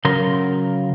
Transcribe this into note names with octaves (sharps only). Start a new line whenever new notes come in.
C#3 F#3 A#4 C6